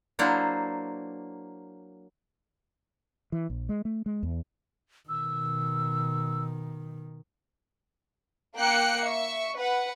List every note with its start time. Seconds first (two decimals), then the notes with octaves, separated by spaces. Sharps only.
0.19 F#3 A#3 D4 E4 C5
3.32 E3
3.50 A#1
3.69 G#3
3.85 A3
4.06 G#3
4.23 E2
5.09 B2 D#3 E6
8.57 A#3 G5 F#6 C#7
9.04 E5 C#6
9.57 B4 F#5